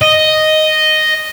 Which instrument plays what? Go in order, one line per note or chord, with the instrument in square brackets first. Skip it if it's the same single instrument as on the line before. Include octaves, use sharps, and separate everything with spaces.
[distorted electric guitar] D#5